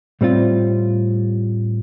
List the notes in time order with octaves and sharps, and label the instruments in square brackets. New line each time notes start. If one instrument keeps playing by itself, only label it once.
[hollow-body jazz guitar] A2 G3 C4 F4